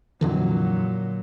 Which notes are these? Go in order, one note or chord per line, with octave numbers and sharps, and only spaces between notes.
F2 A#2 D3 E3 F#3